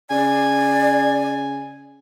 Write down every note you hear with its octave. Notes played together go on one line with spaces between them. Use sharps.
C#3 D5 G#5